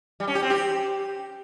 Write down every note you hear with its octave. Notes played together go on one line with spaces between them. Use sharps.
G3
C#4
G4
C4
G4